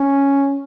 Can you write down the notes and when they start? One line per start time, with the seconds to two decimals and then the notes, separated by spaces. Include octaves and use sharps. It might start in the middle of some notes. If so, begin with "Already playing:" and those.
Already playing: C#4